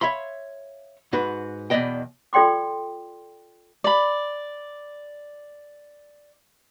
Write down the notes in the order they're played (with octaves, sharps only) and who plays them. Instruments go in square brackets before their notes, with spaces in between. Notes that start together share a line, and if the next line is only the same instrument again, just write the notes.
[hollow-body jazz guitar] C#5 E5 F5 B5 C6
G#2 F#4 B4
E2 B2 F#3 D5 D#5 G5
[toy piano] F4 A4 D5 G5 C6 D6
[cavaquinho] D5 B5